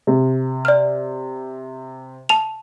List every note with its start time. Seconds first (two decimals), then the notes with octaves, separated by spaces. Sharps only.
0.07 C3
0.65 D5 F6
2.29 A5 F7